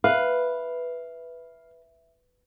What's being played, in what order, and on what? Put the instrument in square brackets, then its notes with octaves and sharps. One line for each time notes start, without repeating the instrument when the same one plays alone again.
[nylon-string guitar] B4 [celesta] E5 [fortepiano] F5